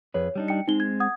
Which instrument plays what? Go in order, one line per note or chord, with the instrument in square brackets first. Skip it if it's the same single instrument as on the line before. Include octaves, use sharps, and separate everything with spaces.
[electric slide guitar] F2 G#4 B4 [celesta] C#5
[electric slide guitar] G3 D4 D#4
[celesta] G5 C#7
[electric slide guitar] G#3 C4 [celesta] D#4 G7
[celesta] G#6
F#5 D#6 G#6